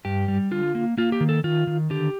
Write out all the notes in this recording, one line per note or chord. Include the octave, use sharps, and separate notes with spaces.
G2 G4
G3
D3 F4
A#3
A#3 F4
G4
D#3
A4
D#3 F4
D#3
D3 G4